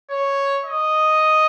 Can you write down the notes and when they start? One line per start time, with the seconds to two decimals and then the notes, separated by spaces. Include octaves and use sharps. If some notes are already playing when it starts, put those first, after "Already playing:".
0.10 C#5
0.65 D#5